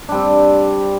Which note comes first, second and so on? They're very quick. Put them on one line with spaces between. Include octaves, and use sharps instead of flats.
D4 G3 C4